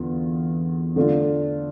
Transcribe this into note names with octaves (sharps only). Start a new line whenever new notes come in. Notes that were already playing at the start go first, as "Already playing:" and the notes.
Already playing: E2 D3 F4
D3 A3 D4 F4